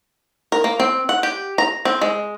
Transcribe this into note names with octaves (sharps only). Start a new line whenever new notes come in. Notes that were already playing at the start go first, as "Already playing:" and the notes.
A#4
A#3
C4
F#5
G4
A#5
C4
G#3